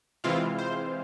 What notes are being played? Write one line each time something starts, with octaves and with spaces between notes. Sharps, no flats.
C3 E3 G#3 C4 E4 F4 F5
C5